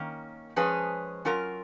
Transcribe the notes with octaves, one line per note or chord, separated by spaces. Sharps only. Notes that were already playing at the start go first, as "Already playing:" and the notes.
Already playing: D#3 A#3 C#4
F3 G#3 C#4 G#4 B4
F#3 C#4 F4 A#4